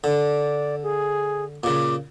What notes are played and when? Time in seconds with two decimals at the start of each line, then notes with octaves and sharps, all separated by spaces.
0.04 D3 D5
0.83 G#4
1.64 A#2 C#3 D6